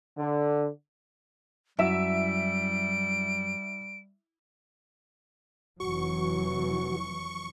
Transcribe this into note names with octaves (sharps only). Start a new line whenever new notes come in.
D3
F#2 G3 E4 E5 D7 E7
F1 E3 F#3 F#4 C#6